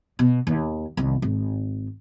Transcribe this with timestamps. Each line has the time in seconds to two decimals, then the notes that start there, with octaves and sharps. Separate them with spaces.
0.19 B2
0.47 D#2
0.97 C2 D#3
1.22 G#1